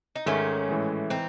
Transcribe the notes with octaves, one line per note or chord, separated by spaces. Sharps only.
D#4
G#2 D#3 G#3 A3 C#4
A2 E3 G#3
E3 C4 D#4